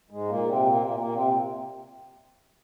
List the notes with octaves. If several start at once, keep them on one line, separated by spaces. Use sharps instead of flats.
G#2 G#3
A#2 A#3
C3 C4
A#2 A#3
A#2 A#3
A#2 A#3
C3 C4